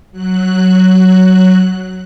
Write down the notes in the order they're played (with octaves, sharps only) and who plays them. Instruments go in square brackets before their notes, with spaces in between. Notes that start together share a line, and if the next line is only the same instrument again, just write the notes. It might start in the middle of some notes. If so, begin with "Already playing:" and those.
[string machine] F#3 F#6